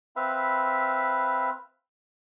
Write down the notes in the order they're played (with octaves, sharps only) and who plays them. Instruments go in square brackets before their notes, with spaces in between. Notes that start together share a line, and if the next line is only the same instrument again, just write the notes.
[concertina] C4 B4 E5 F5 B5